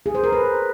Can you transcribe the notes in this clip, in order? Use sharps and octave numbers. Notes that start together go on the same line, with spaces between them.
G#4
C5
A#4
B4